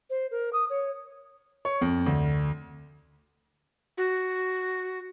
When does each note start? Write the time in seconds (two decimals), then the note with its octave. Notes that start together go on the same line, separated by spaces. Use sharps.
0.10 C5
0.31 A#4
0.53 D#6
0.70 C#5
1.65 C#5
1.81 F2
2.06 D2
3.98 F#4